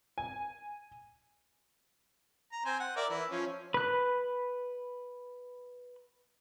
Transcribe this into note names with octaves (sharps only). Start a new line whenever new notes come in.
G#5
A#5
C4 C5 G#5
F#5
A#4 D5 E5
E3 E4
F3 C#4
B4 F#6